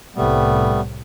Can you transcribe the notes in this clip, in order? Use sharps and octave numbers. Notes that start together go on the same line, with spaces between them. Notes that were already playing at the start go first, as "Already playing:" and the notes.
C2 A2 C3 G3 A3 B3